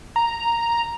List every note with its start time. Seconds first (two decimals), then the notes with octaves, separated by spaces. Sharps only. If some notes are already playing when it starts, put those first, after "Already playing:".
0.16 A#5